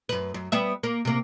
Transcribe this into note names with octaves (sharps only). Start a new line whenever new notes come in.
F#2 B4
F#2
G3 B3 E5
A#3
C3 A#3